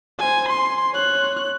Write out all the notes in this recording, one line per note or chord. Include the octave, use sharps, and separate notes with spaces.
C5 G#5
C6
C#5 F#6